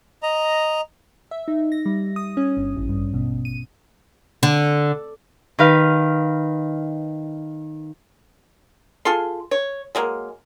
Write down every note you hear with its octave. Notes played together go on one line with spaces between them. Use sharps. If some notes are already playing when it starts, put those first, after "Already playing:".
D#5 A#5
E5
D#4
A#6
G3
D#6
C#4
G1
A1
G2
B2
D#7
D3
D#3 B4 F5
F4 G#4 A4 C6
C#5
F#3 G#3 A#3